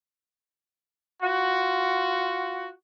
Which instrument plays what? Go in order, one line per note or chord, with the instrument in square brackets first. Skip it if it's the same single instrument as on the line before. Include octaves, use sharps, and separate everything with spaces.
[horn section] F4 F#4